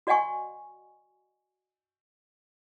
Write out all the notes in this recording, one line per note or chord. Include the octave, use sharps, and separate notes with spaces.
F#4 D5 D#5 F#5 G#5 C#6